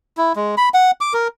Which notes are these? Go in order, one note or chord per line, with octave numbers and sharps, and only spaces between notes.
E4
G#3
B5
F#5
D6
A#4